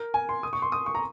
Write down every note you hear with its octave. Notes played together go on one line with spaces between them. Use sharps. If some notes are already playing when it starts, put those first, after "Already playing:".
Already playing: A#4
G#5
C6
D#6
C#6
C6
D#6
C#6
A#5